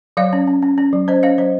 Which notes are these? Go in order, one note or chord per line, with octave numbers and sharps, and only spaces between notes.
F#3 C#5 F5
C#4
C#4
C#4
C#4
F#3
C#4 C5 D#5
C#4 C#5 F5
F#3 C5 D#5